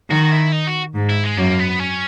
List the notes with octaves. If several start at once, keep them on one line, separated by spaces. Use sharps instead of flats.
D#3 F#4
E4
D#4
F#4
G#2
E4
G#3
F#2 A#3
B3
C#4